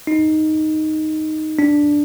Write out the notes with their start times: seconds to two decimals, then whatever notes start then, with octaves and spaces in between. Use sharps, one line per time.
0.07 D#4
1.59 D4